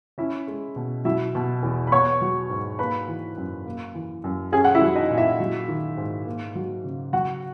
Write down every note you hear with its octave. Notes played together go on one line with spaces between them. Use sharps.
C#4 E4 E5
G#3
B2
F#3 E4 E5
B2
E2
B5
B3 C#5 C#6
F#3
G#2
A#3 B4 B5
E3
F#2
A#3
E3
F#2
C#4 G#4 G#5
F#5
E4 E5
F#3
D#4 D#5
A#2
E4 E5
F#3
D#3
G#2
A#3
F#3
C#3
F#3 F#4 F#5